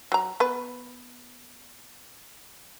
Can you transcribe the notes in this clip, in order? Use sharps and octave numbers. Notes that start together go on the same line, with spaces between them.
F#3 A#5
B3 B4